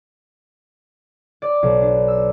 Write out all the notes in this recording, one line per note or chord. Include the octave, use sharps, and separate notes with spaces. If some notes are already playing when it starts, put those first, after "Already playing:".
D5
B1
D4
E6